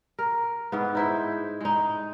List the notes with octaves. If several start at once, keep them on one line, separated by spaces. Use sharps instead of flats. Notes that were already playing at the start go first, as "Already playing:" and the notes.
A#4
G#2 B3
D#4 E4 C5
G#3 D#4